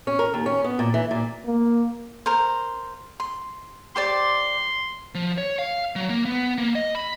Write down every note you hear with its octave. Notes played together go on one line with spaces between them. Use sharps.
C#4
A#4
D#2
C#4
B3
A#2
E3
A#2
A#3
A#4 C5
C6
G4 C5 D5 C6
F3
C#5
F5
F#3
A#3
B3
A#3
D#5
B5